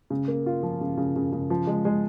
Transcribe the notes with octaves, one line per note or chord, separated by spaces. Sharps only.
C#3
A#3
F4
F3
C#3
C#3
C#3
C#3
F3
G#3
G#3